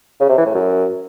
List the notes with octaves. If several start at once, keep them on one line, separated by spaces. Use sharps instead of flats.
C#3
C3
E3
A2
F#2